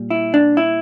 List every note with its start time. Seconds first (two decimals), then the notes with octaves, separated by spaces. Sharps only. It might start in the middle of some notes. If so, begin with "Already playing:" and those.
Already playing: A#2 G3
0.10 E4
0.34 D4
0.57 E4